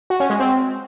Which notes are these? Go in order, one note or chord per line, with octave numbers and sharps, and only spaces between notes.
F#4
C#4
G#3
C4